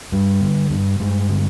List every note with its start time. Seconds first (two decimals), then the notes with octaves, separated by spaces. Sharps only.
0.12 G2 G3
0.41 D3
0.70 G2
1.00 G2 G#3
1.29 D3